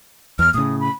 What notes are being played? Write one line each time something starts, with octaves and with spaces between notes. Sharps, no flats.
E2 F6
A2 C#3 D#6
B5